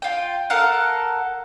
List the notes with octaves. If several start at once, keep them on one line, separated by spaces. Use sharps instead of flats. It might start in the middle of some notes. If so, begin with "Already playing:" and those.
F4 G5
A4 A#4 F5 F#5